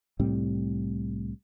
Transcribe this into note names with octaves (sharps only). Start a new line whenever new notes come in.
C2 A2 G3 C4